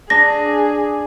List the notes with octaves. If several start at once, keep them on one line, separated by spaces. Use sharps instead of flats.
D4 G#4 A#6